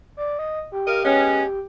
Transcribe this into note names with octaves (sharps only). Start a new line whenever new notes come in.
D5
D#5
G4
A#4 D#5 F5
G#3 B3 C#4